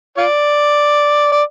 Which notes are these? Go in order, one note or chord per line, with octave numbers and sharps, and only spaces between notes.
F4 D5
D5